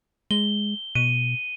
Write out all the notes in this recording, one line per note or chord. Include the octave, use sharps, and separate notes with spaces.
G#3 G7
B2 D#7